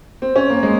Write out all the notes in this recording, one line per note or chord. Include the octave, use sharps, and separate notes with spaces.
C4
C#4
A#3
G#3